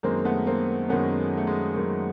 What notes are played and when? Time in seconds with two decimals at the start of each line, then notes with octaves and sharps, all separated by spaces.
0.03 F#2 D#3 G#3 A#3 C4
0.25 A3 B3
0.47 A#3 C4
0.89 F#2 D#3 G#3 B3 C#4
1.37 A3
1.47 G#3
1.76 F#2 D#3 G#3